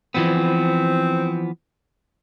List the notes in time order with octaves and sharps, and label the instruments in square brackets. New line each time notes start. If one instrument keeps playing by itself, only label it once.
[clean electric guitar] E3 F3 B3 [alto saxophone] C4